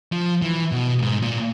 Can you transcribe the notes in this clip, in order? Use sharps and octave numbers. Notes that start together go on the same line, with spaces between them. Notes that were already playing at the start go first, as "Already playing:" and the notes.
F3
E3
B2
G#2
A#2